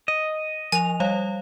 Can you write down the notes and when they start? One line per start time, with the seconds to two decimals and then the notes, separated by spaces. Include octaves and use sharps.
0.08 D#5
0.72 F3 G#5 F7
1.00 G3 C#5 F5